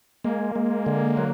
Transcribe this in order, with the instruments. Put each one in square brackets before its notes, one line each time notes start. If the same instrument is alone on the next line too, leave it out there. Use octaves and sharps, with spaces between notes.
[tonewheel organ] G#3 [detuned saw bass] A#3
[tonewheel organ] G#3
D3
F#3